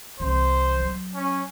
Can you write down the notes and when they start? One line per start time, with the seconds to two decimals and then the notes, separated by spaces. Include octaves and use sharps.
0.20 C2 E3 C5
0.82 F#3
1.15 C#4